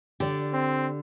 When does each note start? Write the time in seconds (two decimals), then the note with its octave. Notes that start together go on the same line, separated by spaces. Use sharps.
0.20 D3 G4 D5
0.53 C4